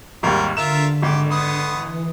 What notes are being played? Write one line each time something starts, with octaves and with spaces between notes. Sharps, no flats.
G#1 D#2 G3 A#4
D3 F4 A#4 E5 E7
G#1 G4
B3 C6 D#6
E3